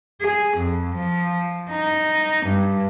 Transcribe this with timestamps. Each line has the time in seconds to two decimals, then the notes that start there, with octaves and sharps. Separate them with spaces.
0.21 G#4
0.57 F2
0.95 F3
1.71 D#4
2.46 G2